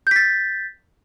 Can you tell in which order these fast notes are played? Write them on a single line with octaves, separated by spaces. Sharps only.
G6 B6 A6